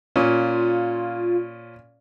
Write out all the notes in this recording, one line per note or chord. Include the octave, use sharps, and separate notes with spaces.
A#2 C#4 F4